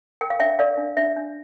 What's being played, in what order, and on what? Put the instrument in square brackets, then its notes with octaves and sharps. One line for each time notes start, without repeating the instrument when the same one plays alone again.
[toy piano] A#4 G5
F5
D4 E5 G5
A#4 D5 F5
D4
D4 E5
D4